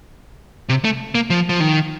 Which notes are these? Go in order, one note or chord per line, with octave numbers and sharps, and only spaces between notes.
C3
A3
A#3
F3
F3
D#3